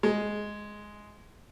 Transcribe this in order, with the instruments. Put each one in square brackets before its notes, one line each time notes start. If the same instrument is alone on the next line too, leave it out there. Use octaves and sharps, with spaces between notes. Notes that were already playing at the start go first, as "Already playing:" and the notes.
[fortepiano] G#3